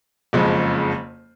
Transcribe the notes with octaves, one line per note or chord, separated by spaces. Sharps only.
F#1 F2 C#3 F3 G#3